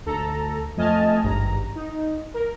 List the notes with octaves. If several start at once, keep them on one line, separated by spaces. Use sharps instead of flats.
D2 A4 A#5
F2 A3 D#5 G#5 A5 F6
G#1 G2 A#5
D#4
A#4